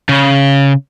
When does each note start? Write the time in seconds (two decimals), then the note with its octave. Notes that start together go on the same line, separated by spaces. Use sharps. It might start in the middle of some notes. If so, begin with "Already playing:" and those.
0.09 C#3